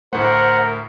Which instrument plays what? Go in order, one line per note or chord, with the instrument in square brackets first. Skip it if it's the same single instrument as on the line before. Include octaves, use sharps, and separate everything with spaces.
[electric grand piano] D2 A2 A3 [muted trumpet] A#4 [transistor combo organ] C5 F#5